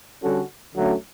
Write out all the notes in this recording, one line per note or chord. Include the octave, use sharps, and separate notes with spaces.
D3 G3 C#4 F#4 A4
D2 D3 F#3 A3 C#4